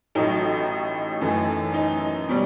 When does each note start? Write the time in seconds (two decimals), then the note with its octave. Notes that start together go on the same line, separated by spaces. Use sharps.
0.15 A1 A2 F#3 A3 D#4
1.21 F#2 E3 A3
1.74 D#4
2.29 B2 G3